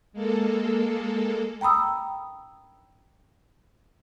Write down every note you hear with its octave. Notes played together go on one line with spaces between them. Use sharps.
G#3 A#3 A4
G5 A#5 B5 D#6 E6